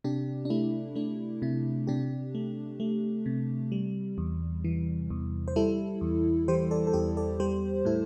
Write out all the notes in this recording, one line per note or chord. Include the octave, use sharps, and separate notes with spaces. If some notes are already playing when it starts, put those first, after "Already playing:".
C3 D4 G4
D4
A3 E4
A3 D4
C3 E4
C3 D4 G4
A3
A3
C3
G3
E2
E3
E2
C5
G3 E4 A4
E2
E3 G4 C5
A4 D5
A4
E2 G4 C5
A4 D5
G3 G4 C5
A2 E4 A4